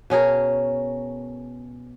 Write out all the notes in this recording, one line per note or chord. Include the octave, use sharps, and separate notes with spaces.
B2 C#4 G#4 A#4